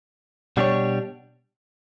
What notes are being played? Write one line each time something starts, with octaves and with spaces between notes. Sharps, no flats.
B2 G3 D4 G4 C#5